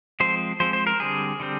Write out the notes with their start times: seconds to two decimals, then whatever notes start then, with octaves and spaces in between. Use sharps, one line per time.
0.20 F3 G#3 C4 C5
0.60 F3 G#3 C4 C5
0.73 C5
0.87 A#4
1.00 D3 G3 C4 G#4
1.40 D3 G3 C4